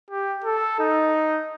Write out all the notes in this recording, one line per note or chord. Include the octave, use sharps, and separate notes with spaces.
G4
A4
D#4